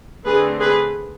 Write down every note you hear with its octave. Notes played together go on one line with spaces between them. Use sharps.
D3 A3 C4 G#4 B4
G#4 B4